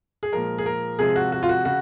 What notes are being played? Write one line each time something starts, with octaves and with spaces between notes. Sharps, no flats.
G#4
A#2 F3 G#3 A#4
G#4
A#4
C3 F3 G#3 G#4
F#4
F#4
F4
F#4
C#3 F#4